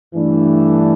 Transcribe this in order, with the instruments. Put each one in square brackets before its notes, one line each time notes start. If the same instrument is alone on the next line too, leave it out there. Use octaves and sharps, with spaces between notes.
[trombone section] G2 E3 A3 D4